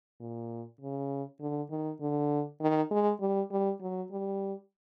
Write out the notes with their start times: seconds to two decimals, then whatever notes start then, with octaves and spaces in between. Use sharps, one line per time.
0.20 A#2
0.81 C#3
1.40 D3
1.71 D#3
2.01 D3
2.61 D#3
2.91 G#3
3.21 G3
3.51 G3
3.81 F#3
4.11 G3